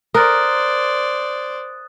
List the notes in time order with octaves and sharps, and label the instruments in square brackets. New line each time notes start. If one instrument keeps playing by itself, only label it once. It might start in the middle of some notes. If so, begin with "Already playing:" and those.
[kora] A#4 [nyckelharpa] C5 D5 [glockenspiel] D#6 F#6 A6